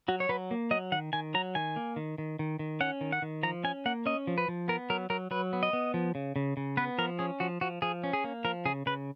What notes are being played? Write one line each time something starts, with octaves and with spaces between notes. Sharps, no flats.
F#3 F#4
C#5
F#3 B4
A#3
F#3 D#5
D#3 F#5
D#3 G#5
F#3 A#5
D#3 G#5
A#3
D#3
D#3
D#3
D#3
C#4 F#5
D#3
F#5
D#3
F3 A#5
C#4 G#5
A#3 F#5
C#4 D#5
F3
B4
F3
B3 A#4
F#3 A#4
F#3 A#4
F#3 B4
B3
D#5
B3
F3
C#3
C#3
C#3
B3 B4
F3 A#4
C#4 G#4
F3 F#4
F3 F#4
F3 G#4
C#4
G#4
A#3
F3 A#4
C#3 G#4
C#3 B4